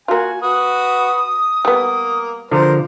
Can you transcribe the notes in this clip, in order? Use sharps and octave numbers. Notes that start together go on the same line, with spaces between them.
A#3 F4 F#4 G#5
F#4 B4 D#6
G3 A#3 B3
D3 F3 A#4 C5